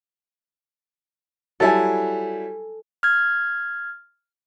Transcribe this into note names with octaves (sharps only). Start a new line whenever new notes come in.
F#3 G3 E4 A4 G#5
F6 G#6